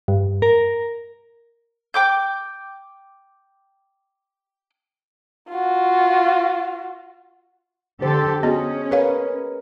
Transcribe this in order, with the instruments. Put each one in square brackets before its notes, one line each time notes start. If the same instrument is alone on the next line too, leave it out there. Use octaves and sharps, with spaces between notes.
[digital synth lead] G2
A#4
[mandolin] G5 D6 G6
[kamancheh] F4 F#4
[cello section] D3 G4 A4 [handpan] C5
[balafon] B3 F#4 [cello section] C#4 [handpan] G#4 D#5
[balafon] G#4 C#5 F5 [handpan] A#4 B4